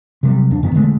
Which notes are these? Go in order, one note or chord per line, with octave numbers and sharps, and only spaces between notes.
C3 F#3 G3
D#2 D4
G2 D#3 B3
E1 D3 G#3 A3